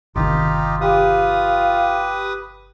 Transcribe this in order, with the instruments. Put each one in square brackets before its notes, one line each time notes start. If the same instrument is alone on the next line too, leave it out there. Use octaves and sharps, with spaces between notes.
[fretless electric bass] G1 C2 D#3 [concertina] D#4 F4 G4
[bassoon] F4 [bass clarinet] G4 [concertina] B4 D#6